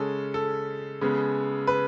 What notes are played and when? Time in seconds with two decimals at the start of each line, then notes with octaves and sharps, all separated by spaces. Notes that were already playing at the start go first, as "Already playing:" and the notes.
Already playing: C#3 G#3 C#4 A4
0.34 A4
1.01 C#3 G#3 B3
1.67 B4